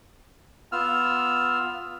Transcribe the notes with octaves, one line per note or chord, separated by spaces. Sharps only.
B3 F4 E6 F6